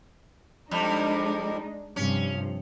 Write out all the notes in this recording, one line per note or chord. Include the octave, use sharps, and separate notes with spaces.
F2 G3 G#3 D4 D#4
G2 C3 F3 C#4